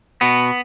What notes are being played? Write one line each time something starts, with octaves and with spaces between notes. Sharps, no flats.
B2 B3